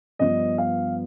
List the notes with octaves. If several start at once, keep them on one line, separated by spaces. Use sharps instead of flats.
G2 F3 B3 D4 D#5
F5